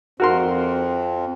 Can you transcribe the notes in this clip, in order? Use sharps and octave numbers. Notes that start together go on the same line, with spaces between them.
F2 C4 F#4 A#4 C6